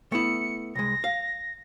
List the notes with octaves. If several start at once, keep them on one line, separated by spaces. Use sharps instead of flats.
A3 B3 E4 C#7
C2 G#3 A#6
F5